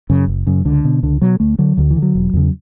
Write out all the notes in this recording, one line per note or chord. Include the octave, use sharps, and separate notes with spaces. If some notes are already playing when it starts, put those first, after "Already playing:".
F#2 C#3
F#1
F#2 C#3
C#2 D3
B2
C#2 D3
B2 F#3
D2 A3
D3 F#3
D2 D3
E3
D3
F#3
E1
E2 C#3